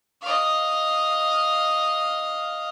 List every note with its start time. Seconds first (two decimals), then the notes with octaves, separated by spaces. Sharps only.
0.22 D#5 F5